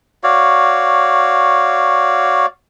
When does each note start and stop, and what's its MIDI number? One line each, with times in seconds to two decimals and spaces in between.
0.24 2.46 66
0.24 2.46 73
0.24 2.46 74
0.24 2.46 77